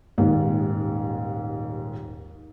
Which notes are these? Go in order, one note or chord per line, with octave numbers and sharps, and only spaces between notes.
D#1 D#2 G#2